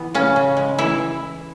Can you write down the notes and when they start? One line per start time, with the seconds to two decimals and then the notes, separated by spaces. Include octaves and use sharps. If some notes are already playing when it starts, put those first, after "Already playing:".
Already playing: E3 B3
0.14 C#3 C#4
0.36 C#3
0.57 G#3
0.79 E3 E4